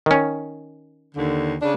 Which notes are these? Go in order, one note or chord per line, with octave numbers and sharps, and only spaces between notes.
D#3 C#4
D#2 D3
C#3 D4